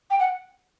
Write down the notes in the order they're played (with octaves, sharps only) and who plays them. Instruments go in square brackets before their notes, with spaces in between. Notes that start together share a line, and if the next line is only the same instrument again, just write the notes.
[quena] G5
F#5